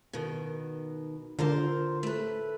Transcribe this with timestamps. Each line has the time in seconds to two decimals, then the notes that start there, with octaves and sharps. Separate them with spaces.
0.13 B2 D#3
1.39 D3 F4 A#4 C5
2.03 A3 B4